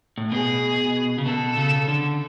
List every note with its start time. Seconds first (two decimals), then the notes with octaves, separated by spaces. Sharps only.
0.18 A2
0.31 B2 G#4
1.18 C#3
1.24 B2 A4
1.57 C#3
1.88 D3